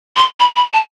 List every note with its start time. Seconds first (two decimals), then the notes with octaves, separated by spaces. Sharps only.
0.17 C6
0.40 B5
0.56 B5
0.73 A5